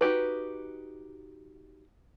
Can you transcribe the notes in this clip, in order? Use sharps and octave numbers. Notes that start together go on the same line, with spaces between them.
D#4 F#4 G4 B4